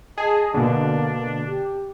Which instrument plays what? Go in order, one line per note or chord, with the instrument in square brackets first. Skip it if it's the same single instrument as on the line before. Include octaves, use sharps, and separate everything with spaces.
[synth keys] G#4 [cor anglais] D#5 [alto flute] A5
[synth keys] B2 D3 [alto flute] A#3 [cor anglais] D4
[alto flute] G4